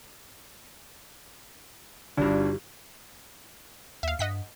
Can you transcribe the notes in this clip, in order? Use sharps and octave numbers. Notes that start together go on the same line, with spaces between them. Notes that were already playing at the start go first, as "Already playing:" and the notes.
G1 G2 D4 D#4 F#4 G4
D#2 E5 F5
G2 D#5 F#5 B6